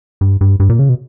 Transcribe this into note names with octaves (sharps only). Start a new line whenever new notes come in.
G2
G2
G2
A#2
C#3
B2